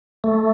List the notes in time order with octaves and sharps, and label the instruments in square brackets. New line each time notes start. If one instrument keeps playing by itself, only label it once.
[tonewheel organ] A3